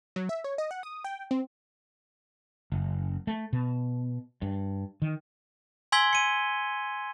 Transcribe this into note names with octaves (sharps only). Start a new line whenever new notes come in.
F#3
E5
C#5
D#5
F#5
D#6
G5
C4
F#1
A3
B2
G2
D#3
G#5 C6 E6 G#6 B6 G7
C#7 D#7